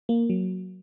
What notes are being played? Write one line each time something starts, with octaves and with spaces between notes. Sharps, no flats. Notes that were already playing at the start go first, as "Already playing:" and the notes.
A#3
F#3